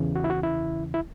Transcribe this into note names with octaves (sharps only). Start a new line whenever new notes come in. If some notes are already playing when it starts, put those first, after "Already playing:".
Already playing: E2 C#3 E3
F#4
E4
F#4
E4
E4